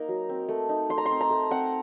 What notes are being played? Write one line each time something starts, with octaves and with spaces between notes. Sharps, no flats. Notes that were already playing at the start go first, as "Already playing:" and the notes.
Already playing: A#3 D#4 A#5
F#3
C4
A3
D#4
A3 C6
A#5
C6
C4
A#5
A3
C4 F#5